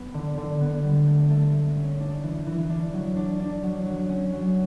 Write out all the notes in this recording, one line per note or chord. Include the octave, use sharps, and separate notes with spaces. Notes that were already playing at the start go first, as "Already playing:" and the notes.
Already playing: B3
D3
D3
B3
G3
A3
A3
A3
C#4
D4
E3
E3
D4
F#3
D4
D4
F#3
F#3
C#4
F#3